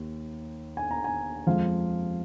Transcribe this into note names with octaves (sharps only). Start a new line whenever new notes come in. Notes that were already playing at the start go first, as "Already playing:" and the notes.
Already playing: D#2 A#3
G#5
A#5
G#5
F2 F3 G#3 F5